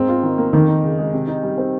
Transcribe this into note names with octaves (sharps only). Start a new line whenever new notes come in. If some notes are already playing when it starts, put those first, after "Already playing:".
Already playing: G#2 A#3 C4
F4
D#3
A#3
F2 D#3
D#4
C#3
G#3
C3
D#4
G3
C4